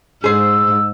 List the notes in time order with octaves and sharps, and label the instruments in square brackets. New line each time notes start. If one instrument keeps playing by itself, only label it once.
[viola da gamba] G#2 [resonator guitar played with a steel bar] G#4 C5 [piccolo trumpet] E6